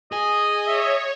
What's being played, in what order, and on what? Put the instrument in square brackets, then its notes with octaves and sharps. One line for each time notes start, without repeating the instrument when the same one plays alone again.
[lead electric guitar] G#4 G#5 [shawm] D#5
[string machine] C#5 [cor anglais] E5